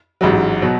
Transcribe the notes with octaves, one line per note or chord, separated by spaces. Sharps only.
A1 G#2 F#3
B2 F#3